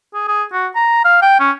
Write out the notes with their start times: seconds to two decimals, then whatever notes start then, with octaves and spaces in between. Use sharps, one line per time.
0.14 G#4
0.28 G#4
0.53 F#4
0.75 A#5
1.05 F5
1.22 G5
1.40 C#4